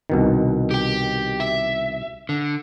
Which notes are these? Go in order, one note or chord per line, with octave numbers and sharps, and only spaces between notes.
C2 B2 D#3
G4 G5
E5
D3